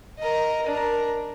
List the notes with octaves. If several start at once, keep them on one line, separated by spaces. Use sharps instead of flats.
A#4 D#5
D4 A#4